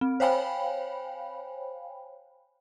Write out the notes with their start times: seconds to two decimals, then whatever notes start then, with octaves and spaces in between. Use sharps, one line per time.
0.01 C4
0.20 C5 C#5 F5 G5 G#5 B5